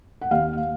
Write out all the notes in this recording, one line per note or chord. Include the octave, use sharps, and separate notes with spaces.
F#5
D#2 F5